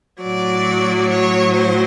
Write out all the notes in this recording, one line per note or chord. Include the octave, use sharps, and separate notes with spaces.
A2 F#3 D5
C#5
C5